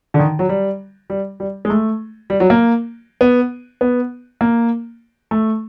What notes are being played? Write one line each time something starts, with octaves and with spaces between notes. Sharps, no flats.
D3
D#3
F#3
G3
G3
G3
G#3
A3
G3
F#3
A#3
B3
B3
A#3
A3